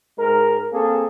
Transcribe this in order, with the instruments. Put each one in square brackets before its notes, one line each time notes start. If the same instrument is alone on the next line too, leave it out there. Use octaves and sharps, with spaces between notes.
[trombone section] G#2 G#3 A#4
A#3 C4 G#4 A4